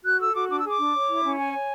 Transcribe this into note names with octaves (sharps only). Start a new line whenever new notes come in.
F#4 F#6
A4 E6
F#4 D6
D4 D6
E6
G#4 D6
D4
C#5
E4
C#4
C#5 G#5
C#5